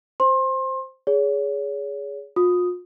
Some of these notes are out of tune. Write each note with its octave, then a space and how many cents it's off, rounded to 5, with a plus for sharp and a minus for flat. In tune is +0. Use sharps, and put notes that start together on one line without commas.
C5 +0 C6 +30
G#4 +0 C#5 +35
F4 +40 D#6 +0